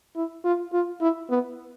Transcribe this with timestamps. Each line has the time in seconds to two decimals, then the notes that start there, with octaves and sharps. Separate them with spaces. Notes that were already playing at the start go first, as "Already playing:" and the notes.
0.16 E4
0.44 F4
0.73 F4
1.01 E4
1.30 B3